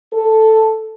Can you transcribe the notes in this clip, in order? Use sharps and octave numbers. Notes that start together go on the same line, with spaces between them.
A4